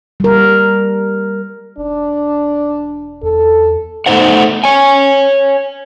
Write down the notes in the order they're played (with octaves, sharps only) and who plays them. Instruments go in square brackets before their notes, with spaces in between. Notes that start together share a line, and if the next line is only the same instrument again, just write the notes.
[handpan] G3 A#4
[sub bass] E1 [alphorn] D4
[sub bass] E2 [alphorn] A4
[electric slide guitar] A3 B3 D#4 C5 C#5 F#5
C#5 G#5